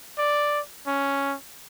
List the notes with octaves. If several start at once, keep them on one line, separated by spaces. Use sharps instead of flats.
D5
C#4